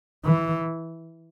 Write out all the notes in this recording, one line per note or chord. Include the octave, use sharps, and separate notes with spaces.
E3